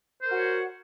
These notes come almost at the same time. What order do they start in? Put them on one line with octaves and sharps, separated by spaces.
C5 A#4 F#4 F#5 C#5